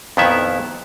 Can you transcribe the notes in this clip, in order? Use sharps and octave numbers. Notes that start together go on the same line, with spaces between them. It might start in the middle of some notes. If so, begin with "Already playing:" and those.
F2 A#2 D#3 B3 E4 E5